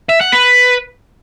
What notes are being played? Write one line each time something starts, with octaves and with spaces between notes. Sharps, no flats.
E5
F#5
B4